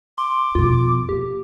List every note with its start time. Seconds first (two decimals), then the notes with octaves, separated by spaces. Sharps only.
0.18 C6 D6
0.55 F2 B2 F4
1.09 A#3 G4